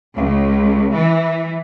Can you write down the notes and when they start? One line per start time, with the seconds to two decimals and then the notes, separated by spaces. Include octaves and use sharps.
0.15 C#2
0.94 E3